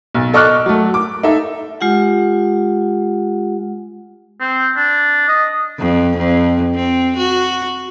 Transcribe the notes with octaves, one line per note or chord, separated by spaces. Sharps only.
B1
A4 D#5 C#6 D6 F6 F#6
F#3 A3
D6
D#4 A4 E5
G#3 F4 G4 F#5
C4
D4
D#5
F2
F2
C4
F#4